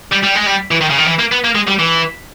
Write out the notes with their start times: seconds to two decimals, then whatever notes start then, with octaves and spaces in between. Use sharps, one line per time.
0.12 G3
0.24 G3
0.36 G#3
0.47 G3
0.71 E3
0.81 D#3
0.90 C#3
0.98 D#3
1.07 E3
1.19 A#3
1.32 B3
1.44 A#3
1.55 G#3
1.68 G3
1.79 E3